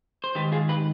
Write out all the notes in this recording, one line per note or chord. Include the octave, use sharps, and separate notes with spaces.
C5
G#2 D#3 G4 B4
F4 G#4
G4 B4